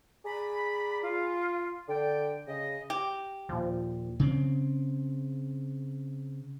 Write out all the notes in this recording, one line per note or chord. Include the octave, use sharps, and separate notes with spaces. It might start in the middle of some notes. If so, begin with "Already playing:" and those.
G#4 D5 A#5 B5
F4
D3 D5 G5
C#3 D#5
G4
D#2 A#2 F3
C#3 C4